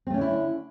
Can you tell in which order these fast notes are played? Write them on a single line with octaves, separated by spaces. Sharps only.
C4 A3 C#4 D3 E4